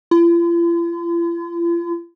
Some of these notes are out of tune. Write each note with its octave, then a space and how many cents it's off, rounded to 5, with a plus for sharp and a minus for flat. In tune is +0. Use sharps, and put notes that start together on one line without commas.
F4 -45